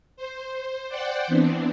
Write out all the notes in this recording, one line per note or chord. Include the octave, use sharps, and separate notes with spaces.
C5
C5 D5 F#5 G5
E3 B3 C4 D4